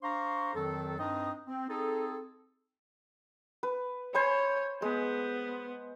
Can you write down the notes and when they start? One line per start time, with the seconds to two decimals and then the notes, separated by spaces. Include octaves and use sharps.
0.03 D4 C5 F5 A#5 C6 C#6
0.55 F2 D#3 F#3 A4
0.99 G2 C4 D4 D#4 D#5 D#6
1.47 C4
1.69 C4 D#4 G#4 A4
3.63 B4
4.14 C5 C#5 G#5 B5
4.82 G#3 B3